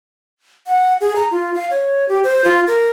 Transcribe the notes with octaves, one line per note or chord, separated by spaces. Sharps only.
F#5
G#4
A#5
F4
F5
C#5
G4
C5
F4
A#4